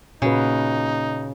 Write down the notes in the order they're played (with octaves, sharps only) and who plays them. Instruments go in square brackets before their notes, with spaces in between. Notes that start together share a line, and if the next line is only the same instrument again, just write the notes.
[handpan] A#2 F#4 B4 [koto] C#3 [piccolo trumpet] D#4